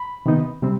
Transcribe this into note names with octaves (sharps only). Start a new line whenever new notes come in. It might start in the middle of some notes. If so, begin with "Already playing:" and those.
Already playing: B5
C3 D#3 B3 D#4
C3 G3 C4